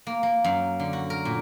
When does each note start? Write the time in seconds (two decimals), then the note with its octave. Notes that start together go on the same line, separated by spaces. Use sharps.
0.07 A#3
0.23 A#3
0.44 F#2
0.80 D3
0.93 F#4
1.10 A#4
1.25 A#2